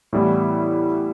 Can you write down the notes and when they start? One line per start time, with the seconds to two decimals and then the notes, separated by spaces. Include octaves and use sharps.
0.13 A2 E3 G3 B3 E4